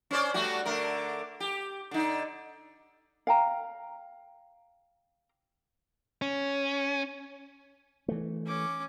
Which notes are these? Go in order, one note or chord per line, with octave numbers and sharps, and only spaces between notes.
C#4 C5 D5
G3 A3 F#4
D3 A3 A#4
G4
D3 D#4
F5 G5 A#5
C#4
E3 A3
C#4 D6